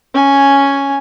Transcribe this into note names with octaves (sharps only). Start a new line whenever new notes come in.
C#4 G#5